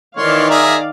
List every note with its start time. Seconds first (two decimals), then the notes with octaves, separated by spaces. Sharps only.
0.17 D#3 E3 C#5 D5 F5 C6
0.50 G#4 E5 A#5